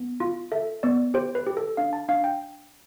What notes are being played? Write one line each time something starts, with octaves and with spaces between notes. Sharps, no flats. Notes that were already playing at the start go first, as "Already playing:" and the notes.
Already playing: B3
F4
A4 E5
B3 D5
G4 C5
B4
G4
A4
D4 F5
A5
D4 F5
G5